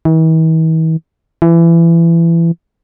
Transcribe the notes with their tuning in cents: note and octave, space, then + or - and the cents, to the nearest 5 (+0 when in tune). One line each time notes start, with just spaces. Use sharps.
E3 -45
E3 +25